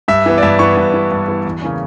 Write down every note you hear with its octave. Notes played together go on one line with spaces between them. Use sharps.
G2 E5
E3 B3
D5
G2 E5
E3 B3 C#6
G2
E3 B3
G2
E3 B3
E2
C#3 E3 A#3 C#4